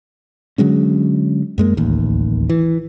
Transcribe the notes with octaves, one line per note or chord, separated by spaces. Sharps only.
D3 F#3 G#3 C#4
F#2 G#3 A#3
D1 A1 D#2
E3